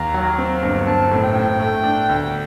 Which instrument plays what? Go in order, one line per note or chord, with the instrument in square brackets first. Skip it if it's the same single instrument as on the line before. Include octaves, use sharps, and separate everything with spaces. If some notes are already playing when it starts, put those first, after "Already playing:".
Already playing: [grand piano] D#2 [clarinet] A#5
[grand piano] F#3
C4
G1
[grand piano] C4 [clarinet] A5
[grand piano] A2
[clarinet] G5
[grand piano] A2
A3
D4
D2